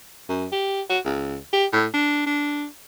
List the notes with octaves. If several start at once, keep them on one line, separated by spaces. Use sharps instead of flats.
F#2
G4
F#4
C#2
G4
A2
D4
D4